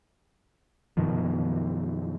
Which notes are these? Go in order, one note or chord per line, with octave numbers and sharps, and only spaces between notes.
F#2 B2 D#3 F3